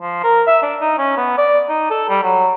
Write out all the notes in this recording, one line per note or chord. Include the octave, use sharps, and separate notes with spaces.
F3
A#4
E5
D4
D#4
C#4
B3
D5
D#4
A4
G3
F#3